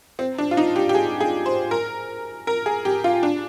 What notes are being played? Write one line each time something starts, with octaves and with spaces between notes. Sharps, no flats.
C4
D4
F4
D#4
G4
G4
G#4
G#4
C5
A#4
A#4
G#4
G4
F4
D4